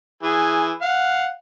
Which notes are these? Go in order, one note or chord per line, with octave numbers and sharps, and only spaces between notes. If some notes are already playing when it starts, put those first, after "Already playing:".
E3 G#4
F5 F#5